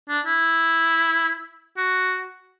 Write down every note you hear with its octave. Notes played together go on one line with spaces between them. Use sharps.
D4
E4
F#4